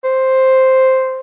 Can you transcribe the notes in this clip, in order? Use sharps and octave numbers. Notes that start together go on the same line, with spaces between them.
C5